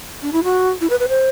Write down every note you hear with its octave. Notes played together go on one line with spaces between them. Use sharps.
D4
E4
F#4
E4
B4
B4
C5